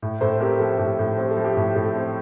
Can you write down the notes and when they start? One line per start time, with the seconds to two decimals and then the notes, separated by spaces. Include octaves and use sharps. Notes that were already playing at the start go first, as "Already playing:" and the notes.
0.02 A2
0.21 A2 A4 C5
0.40 C4 G4 A#4
0.60 F3 A4
0.79 A2 G4
0.99 A2 A4
1.18 C4 G4
1.31 A4
1.37 F3
1.44 G4
1.57 A2
1.75 A2 A4
1.95 C4